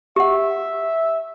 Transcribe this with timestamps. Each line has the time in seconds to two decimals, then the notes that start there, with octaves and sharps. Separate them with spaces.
0.16 G4 E5 F#5